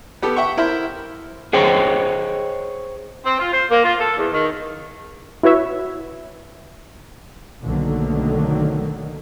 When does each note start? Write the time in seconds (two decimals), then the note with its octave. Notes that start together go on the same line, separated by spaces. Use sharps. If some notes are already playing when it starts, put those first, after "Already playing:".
0.22 B3 G4 A4
0.36 E5 F#5 G5 C#6
0.57 E4 A#4 C5 E5
1.53 G#4 C5 C#5 D#5 G5
3.25 C4
3.39 F4
3.52 C5
3.71 A#3
3.84 F4
3.99 A4
4.16 E2
4.33 D#3
5.43 E4 F#4 B4 C#5 E5
7.63 B1 D3 D#3 F#3 A3 A#3